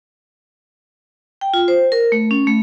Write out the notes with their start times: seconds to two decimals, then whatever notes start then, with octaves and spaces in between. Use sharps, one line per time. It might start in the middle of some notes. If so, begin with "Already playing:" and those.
1.41 G5
1.54 F4
1.68 C5
1.92 A#4
2.12 A3
2.31 C#4
2.47 A3